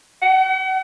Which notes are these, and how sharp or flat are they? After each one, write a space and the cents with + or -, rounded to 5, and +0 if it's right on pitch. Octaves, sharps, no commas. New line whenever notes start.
F#5 +40